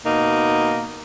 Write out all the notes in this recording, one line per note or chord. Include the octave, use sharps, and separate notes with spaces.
B2 A#3 D#4